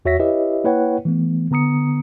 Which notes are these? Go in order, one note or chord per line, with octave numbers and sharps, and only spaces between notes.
E2 F#4 C#5 E5 A#6 B6
E4 G4 B4 C#5 D#5 E5
A#3 E4 B4 C#5 F#5 G5
E3 A3 B3
D3 B3 A#5 D#6 C#7